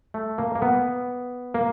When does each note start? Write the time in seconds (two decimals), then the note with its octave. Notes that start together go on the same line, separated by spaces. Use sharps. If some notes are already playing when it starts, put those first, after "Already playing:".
0.14 A3
0.38 A#3
0.55 A#3
0.62 B3
1.54 A#3